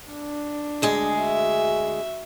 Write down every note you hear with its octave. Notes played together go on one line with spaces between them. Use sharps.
D4
D2 G#3 G#4
F#4 E5